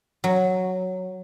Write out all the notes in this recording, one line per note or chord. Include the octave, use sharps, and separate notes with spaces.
F#3